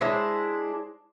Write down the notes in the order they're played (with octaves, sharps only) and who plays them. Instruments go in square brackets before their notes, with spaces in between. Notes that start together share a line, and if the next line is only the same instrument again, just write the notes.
[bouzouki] G#3 D4 E4 C5